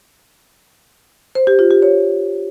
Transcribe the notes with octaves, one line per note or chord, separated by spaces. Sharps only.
C5
G4
F4
G4
C#5